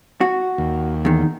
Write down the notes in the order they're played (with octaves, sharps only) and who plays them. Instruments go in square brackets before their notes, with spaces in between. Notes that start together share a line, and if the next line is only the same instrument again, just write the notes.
[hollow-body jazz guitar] F#4
[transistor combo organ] D#2
[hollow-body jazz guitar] E2 D#3